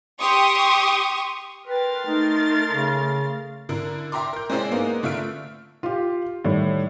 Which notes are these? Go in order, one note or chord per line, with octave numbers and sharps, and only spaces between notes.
G4 C6 C#6 D#6
A#4 B4 G5 C6 A6
A3 D#4
C#3
D3 E4 A#4
E5 G5 A#5 C6 D6
A#4 G6
G#3 C4 C#4 E4 C5 D5
G#3 A#3 B3 D#4 A#4
D3 A3 F4 E5 F6 D7
F4 G4
A2 D#3 G3 D5